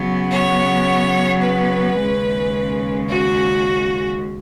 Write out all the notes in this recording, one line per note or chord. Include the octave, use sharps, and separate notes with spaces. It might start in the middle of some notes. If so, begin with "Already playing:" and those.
Already playing: C#3 F#3 B3
C#5
B4
D#2 C#3 G#3 C#4
F#4